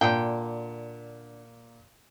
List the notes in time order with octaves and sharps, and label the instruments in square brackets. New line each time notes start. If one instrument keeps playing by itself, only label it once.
[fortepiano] A#2 [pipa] D3 G5